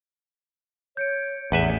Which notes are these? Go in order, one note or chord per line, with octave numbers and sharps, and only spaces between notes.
C#5 G6 C#7 D7
A1 E2 G#4 B4 E5 G7